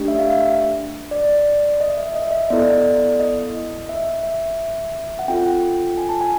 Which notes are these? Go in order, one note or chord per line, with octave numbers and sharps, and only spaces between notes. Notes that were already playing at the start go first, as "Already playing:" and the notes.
Already playing: A3 D4 G4
E5
F5
E5
D5
D#5
E5
D#5
E5
D#5
E5
D#5
B3 E4 A4 D5
D#5
E5
E5
F#5
C4 F4 A4 G5
G#5
A5
G#5